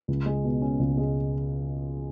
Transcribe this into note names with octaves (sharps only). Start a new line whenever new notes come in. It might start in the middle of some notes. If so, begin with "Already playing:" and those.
C#2
G#3
B2
C#4
C#2
G#3